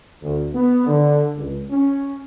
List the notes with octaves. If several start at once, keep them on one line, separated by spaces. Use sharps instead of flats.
D2
B3
D3
C#2
C#4